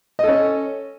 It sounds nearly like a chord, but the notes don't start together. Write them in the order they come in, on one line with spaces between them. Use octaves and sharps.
D#5 A4 C#4